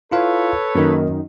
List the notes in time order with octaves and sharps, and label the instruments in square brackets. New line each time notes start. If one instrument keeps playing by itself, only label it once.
[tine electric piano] E4 F4 F5 [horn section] A4 B4 C#5
[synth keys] F#2 D#3 [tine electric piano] A#3 A#4